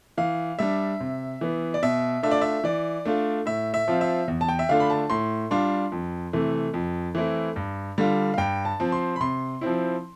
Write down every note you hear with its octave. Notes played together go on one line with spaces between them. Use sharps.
E3 F5
G3 D4 E5
C3
E3 B3
D5
B2 E5
A3 D4 F4 E5
D5
E5
E3 D5
A3 D4 F4
A2 E5
E5
F3 C4 F4
E5
E2
A5
G5
E5
D3 A3 D4 F4 F5
B5
A5
A2 C6
G3 D4 F4 C6
F2
C3 E3 A3
F2
E3 A3 C4 E4
G2
D3 G3 D4 F4
F5
G2 G5
A5
F3 C4
C6
B5
C3 C6
F3 C4 E4